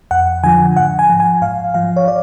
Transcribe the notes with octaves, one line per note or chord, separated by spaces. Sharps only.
F2 F#5
D3 F3 G#5
G#2 F#5
G#5
F3
G#5
G#2 F5
F3 F5
C#5
D5